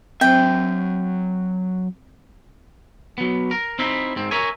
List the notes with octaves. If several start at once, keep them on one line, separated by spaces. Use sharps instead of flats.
F#3 C4 C5 E5 G5
F#3 B3
A#4
C4 D#4 E4 E5
G#2 C4
A#4 C#5 E5 G#5